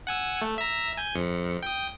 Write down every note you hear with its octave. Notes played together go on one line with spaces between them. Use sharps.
F#5 G#5 E6
A3
E5 A#5
G#5 G6
F2 C#7
G5 D#6